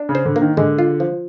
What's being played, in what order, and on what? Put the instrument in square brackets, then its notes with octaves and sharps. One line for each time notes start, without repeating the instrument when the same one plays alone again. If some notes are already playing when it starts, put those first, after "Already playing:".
Already playing: [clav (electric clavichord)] D4
[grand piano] C#3
[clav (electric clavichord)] C5
[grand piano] D3
[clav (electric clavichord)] A#3
[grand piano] D#3
[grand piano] D3 [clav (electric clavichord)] G#3
[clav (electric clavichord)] F4
F3